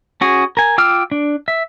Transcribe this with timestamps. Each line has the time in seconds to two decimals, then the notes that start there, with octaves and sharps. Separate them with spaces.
0.21 C#4 F#4 G#4
0.57 A#4 G#5
0.78 F4 G5 D6 E6 F6
1.12 D4
1.48 E5